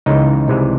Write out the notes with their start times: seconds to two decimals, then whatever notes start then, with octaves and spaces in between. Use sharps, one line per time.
0.06 C#2 C#3 E3 D#4
0.48 C2 C3 E3 G#3